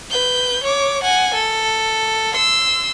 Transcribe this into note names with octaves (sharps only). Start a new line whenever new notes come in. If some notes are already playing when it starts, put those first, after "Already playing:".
B4 G6
C#5 D6
F#5 G#5
A4
C6 E6